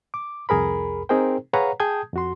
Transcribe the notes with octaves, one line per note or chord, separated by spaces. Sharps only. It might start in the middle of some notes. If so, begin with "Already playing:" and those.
D6
C2 F2 G#4 A#4 B5
C4 D#4 G#4 A#4 C5 G5
G#4 B4 C#5 F5 F#5 A#5
G#4 G5 A5 D#6 G6 G#6
F2 F#4 C6